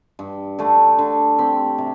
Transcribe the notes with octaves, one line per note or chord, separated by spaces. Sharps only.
G2
D3 A3 D4
D3
C4 G4
C3